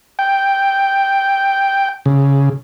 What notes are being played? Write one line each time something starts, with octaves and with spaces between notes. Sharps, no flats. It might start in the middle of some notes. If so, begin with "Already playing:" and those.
G5
C#3